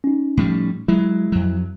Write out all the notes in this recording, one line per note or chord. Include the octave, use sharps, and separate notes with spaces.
C#4 D#4
A2 F3 G3
F#3 G#3 E4
F2 F#3